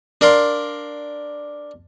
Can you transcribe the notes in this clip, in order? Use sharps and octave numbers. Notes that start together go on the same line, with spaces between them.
D4 A#4 D5 F5 C6